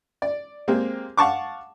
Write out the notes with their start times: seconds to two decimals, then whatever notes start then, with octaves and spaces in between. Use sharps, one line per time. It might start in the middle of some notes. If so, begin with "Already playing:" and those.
0.22 D5
0.68 G#3 A#3 C4 G4 G#4
1.17 F5 F#5 A5 C#6 D6